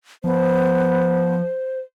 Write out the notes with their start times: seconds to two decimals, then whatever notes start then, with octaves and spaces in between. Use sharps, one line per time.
0.24 F3 B3 C5